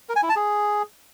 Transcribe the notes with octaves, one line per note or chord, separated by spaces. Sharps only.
A#4
G#5
E4
A5
G#4